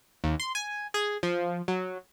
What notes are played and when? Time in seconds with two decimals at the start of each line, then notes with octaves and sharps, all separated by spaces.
0.24 D#2
0.40 C6
0.55 G#5
0.94 G#4
1.23 F3
1.68 F#3